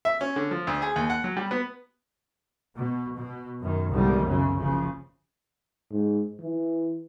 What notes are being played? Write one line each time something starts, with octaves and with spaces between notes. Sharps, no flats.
E5
C#4
D3
F3
D2
G#4
D#2
F#5
F#3
G3
B3
B2
B2
F#2 D#3
C2 G#2 B2 D3 D#3 G3
F#2 C#3 F#3
F#1 C#3 F3
G#2
E3